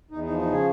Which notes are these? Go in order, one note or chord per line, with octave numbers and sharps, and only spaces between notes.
E2 D#4
D#4
F3
D#4
C#3 G#4